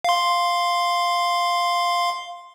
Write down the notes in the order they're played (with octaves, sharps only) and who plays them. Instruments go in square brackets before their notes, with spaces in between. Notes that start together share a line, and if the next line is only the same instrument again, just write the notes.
[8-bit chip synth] F5 C6